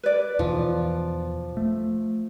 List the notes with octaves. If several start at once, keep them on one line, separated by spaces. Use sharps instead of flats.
B4 D5
E2 B2 E3 F3
A3